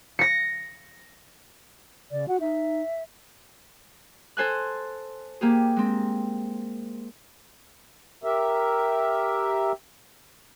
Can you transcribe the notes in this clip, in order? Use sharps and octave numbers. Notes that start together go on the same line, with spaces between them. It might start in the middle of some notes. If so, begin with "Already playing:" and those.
A#6 C#7
C#3 D5
F#4 F#5
D#4 E5
A4 C5 G#5 F#6
A#3 G4 G#4
G#3 C4
G4 A#4 E5